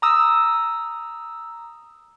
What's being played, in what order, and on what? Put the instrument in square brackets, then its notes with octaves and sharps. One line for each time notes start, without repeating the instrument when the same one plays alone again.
[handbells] A#5 D#6 E6